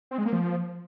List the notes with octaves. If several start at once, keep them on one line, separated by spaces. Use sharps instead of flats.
C4
G#3
A#3
F3